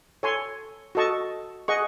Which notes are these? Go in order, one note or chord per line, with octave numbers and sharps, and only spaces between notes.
A4 C#5 G#5 C6
F#4 A4 D#5 A5 C#6
G#4 D#5 F#5 C#6